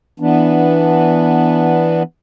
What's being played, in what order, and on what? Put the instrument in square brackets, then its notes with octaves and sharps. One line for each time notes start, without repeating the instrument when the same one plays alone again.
[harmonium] E3 B3 D4